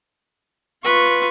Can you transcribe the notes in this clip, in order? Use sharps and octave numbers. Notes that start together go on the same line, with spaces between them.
F4 B4 C#6